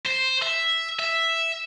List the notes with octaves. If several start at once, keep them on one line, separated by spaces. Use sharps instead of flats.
C5
E5
E5